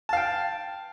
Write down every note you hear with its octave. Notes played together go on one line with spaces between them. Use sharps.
F5 G5 A5